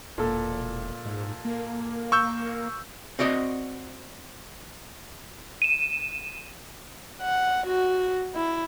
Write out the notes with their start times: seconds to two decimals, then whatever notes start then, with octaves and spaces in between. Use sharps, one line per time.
0.18 E1 A#2 A4
1.05 G#2
1.45 A#3
2.12 C#6 E6 G6
3.19 C4 F#4 D5 D#5
5.62 D#7 E7
7.21 F#5
7.67 F#4
8.35 E4